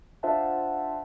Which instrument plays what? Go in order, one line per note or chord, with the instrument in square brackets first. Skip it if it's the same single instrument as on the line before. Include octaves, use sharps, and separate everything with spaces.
[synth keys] D4 F4 C5 E5 F#5 A5